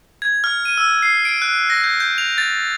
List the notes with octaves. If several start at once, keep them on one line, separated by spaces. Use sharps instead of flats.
G#6
F6
D#7
E6
C7
D7
F#6
A#6
G6
G6
F7
A6